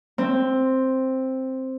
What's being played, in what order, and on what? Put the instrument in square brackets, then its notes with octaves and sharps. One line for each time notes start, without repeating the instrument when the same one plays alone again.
[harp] C4